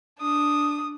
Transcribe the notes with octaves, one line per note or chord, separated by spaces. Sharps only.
D4 D#6